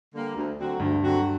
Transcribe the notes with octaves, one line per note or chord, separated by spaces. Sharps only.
D3 G3 A#3
D2
D3 F#3 C4 F#4
D2 G2
D3 F#3 C4 F#4